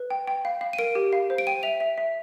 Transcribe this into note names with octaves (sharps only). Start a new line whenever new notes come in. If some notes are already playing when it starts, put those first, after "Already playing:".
Already playing: B4
G5
G5
F5
F5
D#7
A#4 D7
G4
F5
C5
D7
G5 D#7
E5 F7
E5
E5